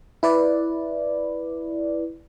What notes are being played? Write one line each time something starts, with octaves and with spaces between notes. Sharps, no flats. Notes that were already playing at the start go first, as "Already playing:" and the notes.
E4 B4 D5